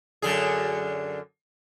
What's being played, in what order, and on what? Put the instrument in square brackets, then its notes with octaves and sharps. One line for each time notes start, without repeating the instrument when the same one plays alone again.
[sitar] F#2 D3 G#4